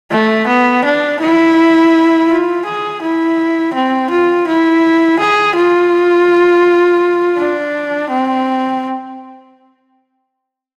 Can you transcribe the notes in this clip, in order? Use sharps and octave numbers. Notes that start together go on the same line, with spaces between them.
A3
B3
D4
E4
F4
G#4
E4
C4
F4
E4
G#4
F4
D4
C4